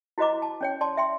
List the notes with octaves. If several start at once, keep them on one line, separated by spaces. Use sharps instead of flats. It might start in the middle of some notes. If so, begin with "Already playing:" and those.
E4 F#4 C5 D#5 A#5 D6
A5
C#4 C#5 G5
D5 A5 C6
E5 G5 C6